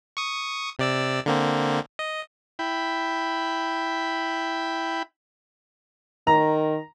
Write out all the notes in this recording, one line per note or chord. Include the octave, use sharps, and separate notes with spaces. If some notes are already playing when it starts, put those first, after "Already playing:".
C#6 D#6
C3 D5 E6
D3 A#3 C4
D#5
E4 G5 B5
D#3 A#5